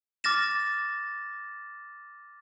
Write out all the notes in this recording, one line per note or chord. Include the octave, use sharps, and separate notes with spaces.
D6 F6 A6 A#6 E7